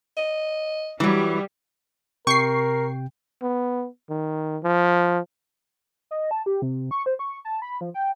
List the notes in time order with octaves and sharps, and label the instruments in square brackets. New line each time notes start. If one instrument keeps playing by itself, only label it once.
[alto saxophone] D#5
[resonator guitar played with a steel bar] E3 F#3 [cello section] G3
[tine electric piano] C3 G5 [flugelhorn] A#4 [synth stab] C#6 C7
[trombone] B3
D#3
F3
[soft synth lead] D#5
A5
G4
C3
C#6
C5
C#6
A5
B5
F3
G5